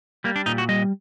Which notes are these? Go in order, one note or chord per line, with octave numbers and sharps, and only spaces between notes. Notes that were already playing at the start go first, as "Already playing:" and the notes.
G3 A#3
D4
A#2 D#4
F#4
G3 D#5